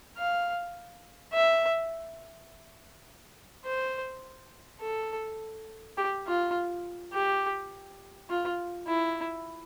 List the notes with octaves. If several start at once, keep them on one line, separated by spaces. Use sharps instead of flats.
F5
E5
C5
A4
G4
F4
G4
F4
E4